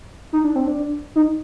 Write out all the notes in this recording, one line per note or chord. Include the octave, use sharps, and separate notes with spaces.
D#4
D4
C4
D4
D#4